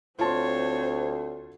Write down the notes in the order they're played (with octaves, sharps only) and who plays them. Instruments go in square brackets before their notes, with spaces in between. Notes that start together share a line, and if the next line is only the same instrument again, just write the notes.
[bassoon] D2 [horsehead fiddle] C4 C5 [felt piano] F4 A5 C6 [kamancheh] C#5